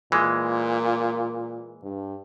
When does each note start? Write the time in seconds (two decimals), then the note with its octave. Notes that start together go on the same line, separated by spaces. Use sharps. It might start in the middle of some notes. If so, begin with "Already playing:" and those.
0.12 A#2 E3 G#3
1.82 G2